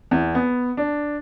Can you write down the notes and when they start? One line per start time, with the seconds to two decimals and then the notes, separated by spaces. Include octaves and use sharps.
0.11 E2
0.35 B3
0.77 D4